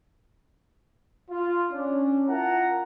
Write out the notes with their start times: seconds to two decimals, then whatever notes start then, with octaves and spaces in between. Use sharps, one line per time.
1.30 F4
1.72 C#4 D4
2.27 E4 F4 A#4 F#5 A5 A#5